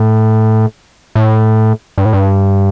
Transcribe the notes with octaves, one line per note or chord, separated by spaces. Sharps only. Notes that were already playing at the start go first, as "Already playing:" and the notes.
Already playing: A2
A2
G2
A2
G2